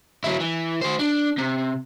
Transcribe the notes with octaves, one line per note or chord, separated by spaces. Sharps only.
F#3 E4
E3
F#4 C5
D4
C3